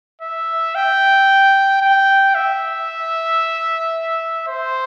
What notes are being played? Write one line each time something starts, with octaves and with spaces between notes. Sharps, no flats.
E5
G5
G5
E5
C5